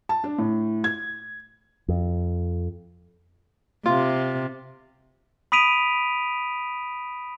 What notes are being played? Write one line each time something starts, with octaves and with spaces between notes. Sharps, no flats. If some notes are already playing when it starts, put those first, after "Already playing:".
A5
D4
A2
G#6
F2
C3 F4
B5 D#6 B6 D7 D#7 F7